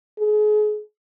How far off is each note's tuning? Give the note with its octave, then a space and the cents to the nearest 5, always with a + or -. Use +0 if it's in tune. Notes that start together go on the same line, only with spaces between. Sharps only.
G#4 +35